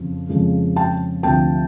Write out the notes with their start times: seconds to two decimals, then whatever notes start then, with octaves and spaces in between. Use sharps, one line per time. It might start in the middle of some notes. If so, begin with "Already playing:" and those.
Already playing: F2 C#3 F3
0.29 F2 C#3 F3 G#3
0.76 G5 A5
1.23 D2 C3 F3 G5 A5